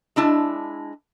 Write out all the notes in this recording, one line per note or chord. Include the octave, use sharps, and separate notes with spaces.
G#3 D4 E4 A5